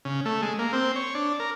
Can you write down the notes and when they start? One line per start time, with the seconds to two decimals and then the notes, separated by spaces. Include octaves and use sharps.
0.05 C#3
0.25 A3
0.42 G#3
0.59 A#3
0.73 C4
0.96 C#5
1.15 D4
1.39 A#4